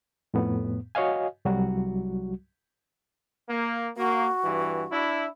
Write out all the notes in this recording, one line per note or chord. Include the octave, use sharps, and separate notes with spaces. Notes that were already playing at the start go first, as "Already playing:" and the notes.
F2 A2 B3
F#4 C#5 D#5 F5 G#5
C2 F#3 G3 F#4
A#3
A#3 F#4
G2 E3
D4 E4